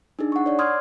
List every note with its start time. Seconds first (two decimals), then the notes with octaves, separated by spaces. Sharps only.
0.19 D4 D#4 G#4
0.32 F#5 C#6
0.46 C#5 D5
0.59 C6 D6 D#6 F6 G#6